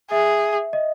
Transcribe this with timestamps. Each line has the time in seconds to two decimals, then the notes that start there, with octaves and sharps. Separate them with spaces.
0.11 G#4 E5
0.73 D#5